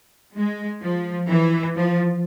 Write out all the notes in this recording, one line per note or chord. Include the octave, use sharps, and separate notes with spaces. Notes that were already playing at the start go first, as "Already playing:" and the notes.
G#3
F3
E3
F3